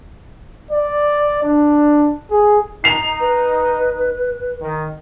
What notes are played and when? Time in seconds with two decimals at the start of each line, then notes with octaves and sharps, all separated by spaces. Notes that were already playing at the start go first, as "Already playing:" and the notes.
0.71 D5
1.43 D4
2.31 G#4
2.84 D#4 C7 F7
3.20 B4
4.61 D#3